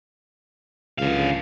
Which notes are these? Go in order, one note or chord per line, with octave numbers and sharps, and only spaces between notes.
C#2 D3 F5